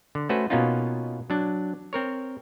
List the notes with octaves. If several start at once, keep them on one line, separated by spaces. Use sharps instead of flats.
D3
A3 C#4 F#4 B4 C5
B2 A#3 B3 C#4 D#4 F4
F#3 D4
C4 A#4 C#5